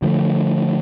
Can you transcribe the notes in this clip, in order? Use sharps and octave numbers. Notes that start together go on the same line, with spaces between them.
D3 F3 A3